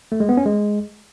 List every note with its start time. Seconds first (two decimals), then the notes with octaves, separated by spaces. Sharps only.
0.12 A3
0.20 G#3
0.29 B3
0.37 C#4
0.46 G#3